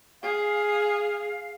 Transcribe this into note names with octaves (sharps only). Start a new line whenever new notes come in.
G#4 F5